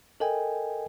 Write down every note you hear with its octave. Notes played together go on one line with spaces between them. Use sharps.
A4 A#4 D#5 G5 G#5